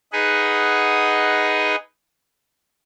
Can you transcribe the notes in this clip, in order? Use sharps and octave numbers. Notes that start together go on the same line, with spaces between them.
D#4 G#4 B4 D#5 F#5